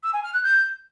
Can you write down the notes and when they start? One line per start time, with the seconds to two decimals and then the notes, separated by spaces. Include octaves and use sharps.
0.03 E6
0.13 G#5
0.23 F6
0.33 F#6
0.43 G6